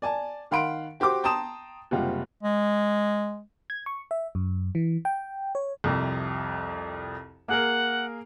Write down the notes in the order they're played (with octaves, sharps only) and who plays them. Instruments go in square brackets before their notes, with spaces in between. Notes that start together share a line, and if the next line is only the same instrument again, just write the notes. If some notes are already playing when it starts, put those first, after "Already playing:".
[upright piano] D5 G#5 A5
D#3 F5 F#5 B5 C6 D7
F#4 G4 C5 C6 D6
G5 A5 A#5 C6 D#6 E7
F#1 C3 G3 G#3 F4 F#5
[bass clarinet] G#3
[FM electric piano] G#6
C#6
E5
F#2
E3
G5
C#5
[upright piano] C2 F2 C3
[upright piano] A#3 G#4 A#4 [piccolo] F#5